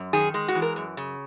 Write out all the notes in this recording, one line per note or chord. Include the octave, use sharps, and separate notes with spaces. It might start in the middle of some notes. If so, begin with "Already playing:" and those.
Already playing: F#2
D#3 G#4
G#3
F#4
E3
A#4
F#2
C#3